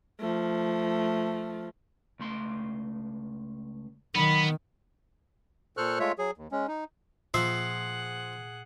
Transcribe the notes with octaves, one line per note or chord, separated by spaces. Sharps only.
F3 A3
C#2 A3 C6
D#3 F#3 B3 B5
A#2 A4 C5 C#6 F6 F#6
G#3 A3 F4 C#5 E5
F#3 G#4
D#2
G#3 C#4
D#4
A#2 F3 G#4 E5 F#5 C7